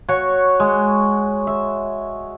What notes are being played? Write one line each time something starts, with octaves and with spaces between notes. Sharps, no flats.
F#4 C#5 C#6
G#3
E5